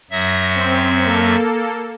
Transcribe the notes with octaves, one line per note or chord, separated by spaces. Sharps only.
F#2 F#3 E5 A#6
C4
A#3 A4